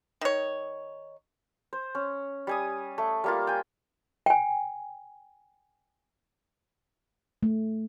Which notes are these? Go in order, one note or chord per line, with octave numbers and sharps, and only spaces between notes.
D#3 C#5
C5
C#4
G3 G#5 D#6
A3
G3 A#3 F4
G5 G#5
G5 G#5
A3